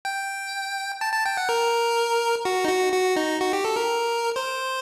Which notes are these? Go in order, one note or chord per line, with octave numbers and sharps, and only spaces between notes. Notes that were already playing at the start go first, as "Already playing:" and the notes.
G5
A5
A5
G5
F#5
A#4
F#4
D#4
F#4
F#4
D#4
F#4
G4
A4
A#4
C5